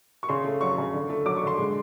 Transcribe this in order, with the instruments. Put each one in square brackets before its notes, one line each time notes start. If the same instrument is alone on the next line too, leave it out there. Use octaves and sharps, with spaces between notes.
[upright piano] C#6
C#3 C6
A3
F#3 C#6
C#3
D3
A3
F#3 D6
C#6
D3 C6
G#3